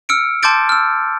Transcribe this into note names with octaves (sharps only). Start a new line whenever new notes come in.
E6 F6 C#7 D7
A5 C6 D6 G6 A6 D7
E6 F6